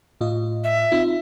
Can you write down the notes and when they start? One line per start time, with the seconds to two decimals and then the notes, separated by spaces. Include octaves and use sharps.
0.21 A2 F4 D#5
0.64 E5
0.92 C4 D#4 F4